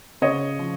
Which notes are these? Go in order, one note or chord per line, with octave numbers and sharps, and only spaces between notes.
C#3 C#5 D#5
F3